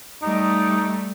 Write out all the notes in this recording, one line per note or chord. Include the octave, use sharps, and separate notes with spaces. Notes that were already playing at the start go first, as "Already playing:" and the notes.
G3 A3 D#4